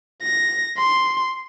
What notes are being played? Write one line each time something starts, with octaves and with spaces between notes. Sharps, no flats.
A#6
C6